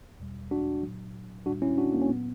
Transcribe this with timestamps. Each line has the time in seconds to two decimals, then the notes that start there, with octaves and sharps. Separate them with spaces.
0.20 E2 B2 G3
0.51 D4 F#4
0.83 A#2 F#3
1.46 A#2 G3 D4 F#4
1.62 C#4 E4
1.77 D4 F#4
1.93 A#3
2.02 C#4
2.09 A#2 F#3 B3